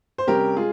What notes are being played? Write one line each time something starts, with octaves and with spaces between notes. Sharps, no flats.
C5
C3 G3 C#4 G4 A#4
G#3 F4 G#4